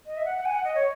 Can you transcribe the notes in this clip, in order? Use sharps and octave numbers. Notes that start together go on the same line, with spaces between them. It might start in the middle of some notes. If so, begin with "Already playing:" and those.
D#5
E5
F#5
F#5
G#5
F#5
D#5
C#5